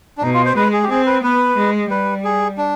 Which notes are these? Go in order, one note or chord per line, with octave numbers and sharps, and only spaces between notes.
D4
B2 D#4
F4
C5
G#3 B4
G#4
G4
C4 G#4
B4
B3 B4
G#3
G3 B4
G#4
D4